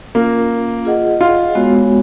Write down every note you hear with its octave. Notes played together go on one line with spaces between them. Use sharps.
A#3 C#4 F4 A#4
F4 G#4 D#5 F#5
F4
G#3 B3 F#4 C#5